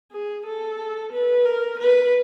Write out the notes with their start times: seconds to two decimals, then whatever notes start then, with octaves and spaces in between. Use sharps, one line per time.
0.12 G#4
0.46 A4
1.12 B4
1.45 A#4
1.79 B4